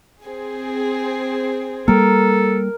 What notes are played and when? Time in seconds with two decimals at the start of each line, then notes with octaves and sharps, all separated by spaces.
0.24 C4 G#4
1.88 G3 A#3 A4 A#4